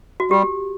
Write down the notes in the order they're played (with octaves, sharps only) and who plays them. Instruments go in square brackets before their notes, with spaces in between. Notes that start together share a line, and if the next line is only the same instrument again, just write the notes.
[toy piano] F#4
[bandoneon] G3 [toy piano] G4